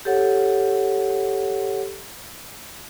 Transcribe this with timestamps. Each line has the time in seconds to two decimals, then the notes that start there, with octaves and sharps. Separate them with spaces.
0.05 G4 A4 C#5 F#5